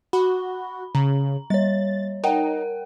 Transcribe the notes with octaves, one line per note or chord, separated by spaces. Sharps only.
F#4 B5
C#3 A#5
G3 C#5 A6
D#4 A#4 F#5 G5